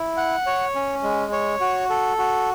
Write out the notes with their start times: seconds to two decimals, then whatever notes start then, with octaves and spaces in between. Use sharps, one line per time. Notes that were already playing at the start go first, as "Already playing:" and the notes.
Already playing: E4
0.17 F#5
0.46 C#5
0.75 C#4
1.03 G#3
1.32 C#5
1.61 F#4
1.90 A4
2.18 F#4